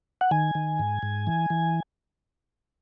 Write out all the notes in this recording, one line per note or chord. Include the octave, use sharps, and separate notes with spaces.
F#5
D#3 G#5
D#3
G#2
G#2
E3
E3